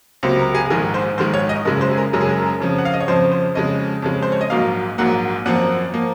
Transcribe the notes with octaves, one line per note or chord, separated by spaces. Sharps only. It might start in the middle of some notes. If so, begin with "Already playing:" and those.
C#2 C3 F#3 A#3 C5
A#4
G#4
G#4
A#1 G#2 D#3 G#3 A#4
C5
A#1 G#2 D#3 G#3 C5
C#5
D#5
F#1 F#2 C#3 G#3 A#4
C5
G#4
A#4
F#1 F#2 C#3 G#3 A#4
G#4
A#4
F2 C#3 F3
F#5
F5
D#5
C#5
F2 C#3 F3 C5
C5
F2 C#3 G#3 D#5
F2 C#3 G#3
C5
C#5
D#5
A#1 G#2 F#3 A#3 F5
A#1 G#2 F#3 A#3 F#5
G#1 F#2 F3 A#3 F#5
F3 A#3